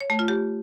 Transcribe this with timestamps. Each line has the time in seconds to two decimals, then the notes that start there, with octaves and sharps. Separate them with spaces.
0.01 C#5
0.10 A3
0.19 F4
0.28 G4